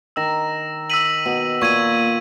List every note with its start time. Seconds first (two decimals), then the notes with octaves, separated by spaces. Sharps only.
0.16 D#3 E6 A#6 E7
0.90 E6 B6 D#7 F#7
1.25 B2
1.61 A#2 C#6 G#6 D#7